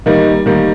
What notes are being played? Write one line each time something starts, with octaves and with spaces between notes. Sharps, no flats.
D#3 G3 A#3 D#4
D#3 G3 A#3